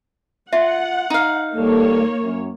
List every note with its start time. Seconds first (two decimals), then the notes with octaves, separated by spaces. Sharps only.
0.53 F4 E5 F#5
1.10 D#4 F5
1.56 D#2 G3 A#3 A4 C#5
2.22 F#2